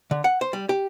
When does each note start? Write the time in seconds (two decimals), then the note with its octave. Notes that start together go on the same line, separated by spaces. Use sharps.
0.11 D3
0.24 F#5
0.41 C5
0.53 G3
0.69 G4